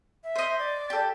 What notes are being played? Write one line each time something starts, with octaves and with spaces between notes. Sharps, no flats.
E5
C5 D#5
D5
G4 A4